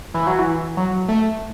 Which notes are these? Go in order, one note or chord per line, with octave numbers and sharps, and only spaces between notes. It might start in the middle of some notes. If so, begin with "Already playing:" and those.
E3
F#3
E3
F#3
A3